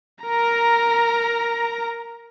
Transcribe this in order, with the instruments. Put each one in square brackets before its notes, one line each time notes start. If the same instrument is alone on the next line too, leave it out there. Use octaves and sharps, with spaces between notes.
[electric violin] A#4 A#5